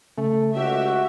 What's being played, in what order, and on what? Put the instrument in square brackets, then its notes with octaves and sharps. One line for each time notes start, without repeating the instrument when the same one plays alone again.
[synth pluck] C#3 [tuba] A3
[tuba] C#2 [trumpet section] F#4 [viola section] G4 E5